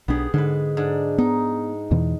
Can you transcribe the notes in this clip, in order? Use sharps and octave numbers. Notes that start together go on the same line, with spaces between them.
B1 B3 D4 G4 G#4
G#2 D3 B4
G#2 D4
B3 D#4
E2 B2 E3